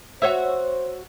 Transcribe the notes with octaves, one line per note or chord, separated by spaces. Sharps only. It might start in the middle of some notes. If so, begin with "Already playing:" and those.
F#4 C5 C#5 E5